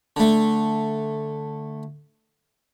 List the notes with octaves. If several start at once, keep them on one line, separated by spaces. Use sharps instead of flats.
D3 A3